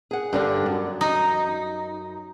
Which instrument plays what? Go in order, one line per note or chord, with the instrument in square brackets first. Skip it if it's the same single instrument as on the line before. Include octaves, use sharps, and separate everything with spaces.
[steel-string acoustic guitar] G#4 F#5
G2 D3 D4
F#2
[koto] D#4